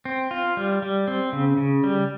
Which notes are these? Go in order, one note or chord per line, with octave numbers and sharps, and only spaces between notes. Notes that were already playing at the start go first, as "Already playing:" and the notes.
C4
F4
G3
G3
C4
C#3
C#3
G3